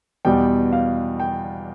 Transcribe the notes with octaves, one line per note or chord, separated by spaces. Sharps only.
E2 B2 G3 G5
F5
G5